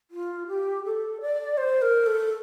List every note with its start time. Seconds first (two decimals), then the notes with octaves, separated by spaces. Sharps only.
0.11 F4
0.48 G4
0.85 A4
1.21 D5
1.57 C5
1.82 A#4
2.06 A4